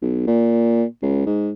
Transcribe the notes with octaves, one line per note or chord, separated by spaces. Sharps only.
B1
A#2
C#2
G#2